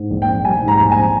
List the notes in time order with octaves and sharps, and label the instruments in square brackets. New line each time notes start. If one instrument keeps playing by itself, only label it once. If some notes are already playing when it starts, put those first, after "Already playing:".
Already playing: [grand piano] G#2
A#1
G5
C4
G3 G#5
G#2
A#5
A#1
G#5
C4